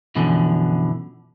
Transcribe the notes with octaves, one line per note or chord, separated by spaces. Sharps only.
F#2 B2 D3 E3 F3